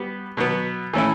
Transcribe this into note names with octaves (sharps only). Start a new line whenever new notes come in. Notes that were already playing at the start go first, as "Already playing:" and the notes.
Already playing: G3 B3
B2 F#3 B3
E3 A3 C#4 E4